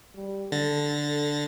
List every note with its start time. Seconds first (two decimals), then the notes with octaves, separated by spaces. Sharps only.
0.16 G3
0.52 D3 A4 A6 A#6